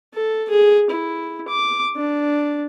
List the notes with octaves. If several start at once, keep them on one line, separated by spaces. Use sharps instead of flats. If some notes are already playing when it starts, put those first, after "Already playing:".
A4
G#4
E4
D6
D4